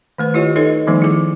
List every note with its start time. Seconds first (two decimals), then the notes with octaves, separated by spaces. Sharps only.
0.18 D#3 A3 B4
0.34 E4 F4 G4 C#5 D#5
0.56 D#4 A4 B4 C#5 D#5
0.87 D#3 F3 G3 A3 B3 D#4
1.02 E4 G#4 D6